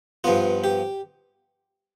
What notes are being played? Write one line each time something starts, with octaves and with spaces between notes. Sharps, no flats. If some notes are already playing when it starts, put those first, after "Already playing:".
G2 F3 B3 F4
G4